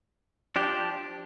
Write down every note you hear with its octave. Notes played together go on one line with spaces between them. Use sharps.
F3 D4 G4